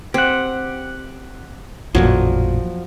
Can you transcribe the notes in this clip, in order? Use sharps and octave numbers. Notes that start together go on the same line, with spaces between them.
C4 G4 F#5
A1 F2 A#2 F3 F#3